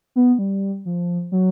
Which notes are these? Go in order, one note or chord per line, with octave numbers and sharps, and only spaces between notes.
B3
G3
F3
F#3